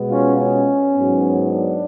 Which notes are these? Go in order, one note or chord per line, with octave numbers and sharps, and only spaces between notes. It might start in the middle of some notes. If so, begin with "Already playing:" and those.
Already playing: B2 G#3 B3
C#4 F4
C#4
G#2 F#3 B3
D4